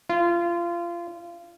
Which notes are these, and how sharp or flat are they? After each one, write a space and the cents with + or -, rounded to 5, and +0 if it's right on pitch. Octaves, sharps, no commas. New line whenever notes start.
F4 -25